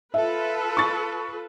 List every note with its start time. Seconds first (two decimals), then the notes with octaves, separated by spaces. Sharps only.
0.14 F4 A4 B4 E5
0.77 C#6 A6